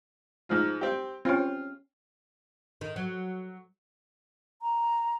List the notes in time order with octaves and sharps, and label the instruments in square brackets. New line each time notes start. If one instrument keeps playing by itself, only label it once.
[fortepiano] G#2 F3 F4
C4 G4
[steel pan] C4 C#4 [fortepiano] F4
[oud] D#3
F#3
[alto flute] A#5